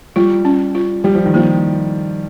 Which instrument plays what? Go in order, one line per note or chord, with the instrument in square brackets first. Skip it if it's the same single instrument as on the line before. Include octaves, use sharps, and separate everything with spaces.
[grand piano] G3 [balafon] F4
[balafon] C#4
F4
[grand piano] G3 [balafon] G4
[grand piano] F3
D#3
[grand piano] F3 [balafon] A#3